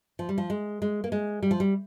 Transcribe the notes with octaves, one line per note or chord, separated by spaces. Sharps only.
F3
G3
F3
G#3
G#3
A#3
G#3
G3
F3
G3